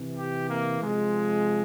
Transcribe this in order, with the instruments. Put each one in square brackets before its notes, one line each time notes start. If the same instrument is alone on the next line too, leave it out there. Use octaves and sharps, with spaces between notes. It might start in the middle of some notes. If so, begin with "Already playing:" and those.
Already playing: [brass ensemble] C3 E3
G4
A#3
C3 F3 G#3